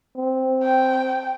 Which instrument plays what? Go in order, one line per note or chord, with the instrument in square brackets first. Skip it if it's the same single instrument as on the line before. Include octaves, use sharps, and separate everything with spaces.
[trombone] C4
[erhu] G5